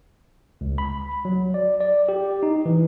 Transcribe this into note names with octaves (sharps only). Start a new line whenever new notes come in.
C#2
B5
F#3
D5
D5
G4
D#4
E3